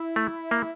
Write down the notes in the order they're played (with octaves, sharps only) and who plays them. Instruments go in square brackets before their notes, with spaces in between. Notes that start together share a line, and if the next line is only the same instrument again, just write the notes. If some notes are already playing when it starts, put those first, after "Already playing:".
Already playing: [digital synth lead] E4
[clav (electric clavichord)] A3
A#3